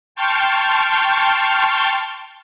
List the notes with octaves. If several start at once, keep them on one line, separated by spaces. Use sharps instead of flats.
G5 A5 C6 C#6 F6 G6